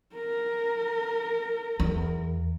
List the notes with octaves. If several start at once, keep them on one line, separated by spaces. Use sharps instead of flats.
A#4
E2